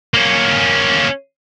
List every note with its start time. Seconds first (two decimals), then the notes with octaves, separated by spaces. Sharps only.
0.14 A#3 C#4